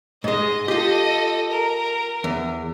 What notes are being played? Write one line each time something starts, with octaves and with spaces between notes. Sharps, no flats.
G#2 G#3 D#5
F4 G4 A4 D#5
A#4
E2